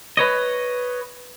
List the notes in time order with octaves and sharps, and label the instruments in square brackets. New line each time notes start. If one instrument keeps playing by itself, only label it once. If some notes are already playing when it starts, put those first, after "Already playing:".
[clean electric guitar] B4 C#5 D#5